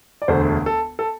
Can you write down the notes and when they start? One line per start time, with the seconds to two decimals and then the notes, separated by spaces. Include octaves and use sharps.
0.22 D5
0.28 E1 D2 D3 A3 C5
0.66 A4
0.99 A4